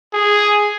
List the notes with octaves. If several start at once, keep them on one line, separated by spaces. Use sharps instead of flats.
G#4